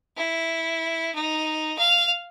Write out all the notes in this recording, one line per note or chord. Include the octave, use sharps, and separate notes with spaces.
E4
D#4
F5